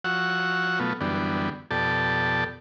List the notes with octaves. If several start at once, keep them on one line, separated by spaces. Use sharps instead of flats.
F3 F#4 F#5 C#6 E6
B2 F#3 A3 B3 F4
F#2 D3 E3 G3 B3 D4
F2 B2 G4 A4 D5 A5